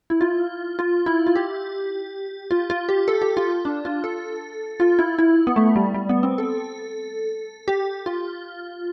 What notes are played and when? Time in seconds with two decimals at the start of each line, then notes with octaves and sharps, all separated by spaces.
0.10 E4
0.21 F4
0.79 F4
1.06 E4
1.27 F4
1.36 G4
2.51 F4
2.70 F4
2.89 G4
3.08 A4
3.22 G4
3.37 F4
3.65 D4
3.85 F4
4.04 A4
4.80 F4
4.99 E4
5.19 E4
5.47 B3
5.56 A3
5.76 G3
5.94 G3
6.09 B3
6.23 C4
6.38 A4
7.68 G4
8.06 F4